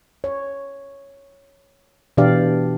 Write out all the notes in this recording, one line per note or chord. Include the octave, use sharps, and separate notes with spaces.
C#5
B2 E3 D4 G4 D5 F5